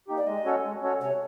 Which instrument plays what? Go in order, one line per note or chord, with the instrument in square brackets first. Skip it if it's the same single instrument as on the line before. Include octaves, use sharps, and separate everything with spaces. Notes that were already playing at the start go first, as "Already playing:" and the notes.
[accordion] A#3 D#4 G4
[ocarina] D5
[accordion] G#3 [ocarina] D#5
[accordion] C#4 F#4 A4 C#5
G#3
C#4 F#4 A4 C#5
[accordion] C3 [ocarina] C#5